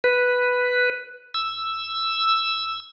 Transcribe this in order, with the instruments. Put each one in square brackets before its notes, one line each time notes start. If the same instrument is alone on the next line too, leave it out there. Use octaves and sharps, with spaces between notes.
[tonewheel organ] B4
E6